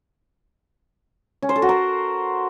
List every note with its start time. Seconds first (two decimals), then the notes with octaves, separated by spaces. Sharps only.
1.42 C#4
1.49 C5
1.56 A4
1.62 F#4
1.69 A#4